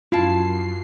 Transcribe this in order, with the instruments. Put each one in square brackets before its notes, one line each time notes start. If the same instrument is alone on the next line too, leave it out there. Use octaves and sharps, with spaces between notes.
[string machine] F#2 C7 [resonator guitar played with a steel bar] E4 F5 A5 [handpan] F4